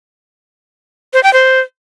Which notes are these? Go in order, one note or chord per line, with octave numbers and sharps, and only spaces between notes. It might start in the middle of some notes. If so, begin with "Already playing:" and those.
C5
G5
C5